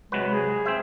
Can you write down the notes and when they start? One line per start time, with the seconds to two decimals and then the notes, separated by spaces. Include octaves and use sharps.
0.12 C3 F#3 G#3 B4
0.32 G#4
0.66 C4 C5 E5